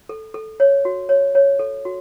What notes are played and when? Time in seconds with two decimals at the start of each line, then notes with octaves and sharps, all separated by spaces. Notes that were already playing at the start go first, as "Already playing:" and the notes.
0.09 A4
0.34 A4
0.60 C#5
0.85 F#4
1.09 C#5
1.35 C#5
1.59 A4
1.85 F#4